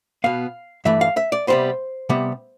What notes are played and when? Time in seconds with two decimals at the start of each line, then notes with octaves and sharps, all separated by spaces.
0.24 B2 B3 F5
0.85 G2 E3 A3 E5
1.01 F5
1.17 E5
1.32 D5
1.47 C3 G3 B3 C5
2.10 C3 G3 B3